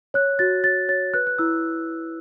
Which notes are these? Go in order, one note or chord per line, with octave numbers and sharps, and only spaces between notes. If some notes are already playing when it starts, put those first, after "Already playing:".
C#5 F#6
F#4 A6
C#5 A6
C#5 A6
B4 F#6
F#6
E4 E6